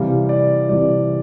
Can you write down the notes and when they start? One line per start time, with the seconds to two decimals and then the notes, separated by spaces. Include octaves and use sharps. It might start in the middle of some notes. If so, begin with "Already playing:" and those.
Already playing: C3 E3 G3 F5
0.29 D5
0.69 C3 E3 G3 D5